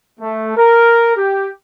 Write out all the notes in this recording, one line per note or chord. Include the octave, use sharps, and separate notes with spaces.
A3
A#4
G4